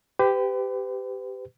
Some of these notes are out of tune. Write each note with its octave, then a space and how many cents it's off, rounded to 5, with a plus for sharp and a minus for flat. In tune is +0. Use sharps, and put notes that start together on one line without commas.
G4 +0 B4 +40